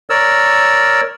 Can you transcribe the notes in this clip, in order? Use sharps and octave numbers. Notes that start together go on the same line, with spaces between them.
A#4 C#5 D5 E6